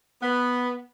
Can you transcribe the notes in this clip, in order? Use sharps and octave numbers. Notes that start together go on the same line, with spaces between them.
B3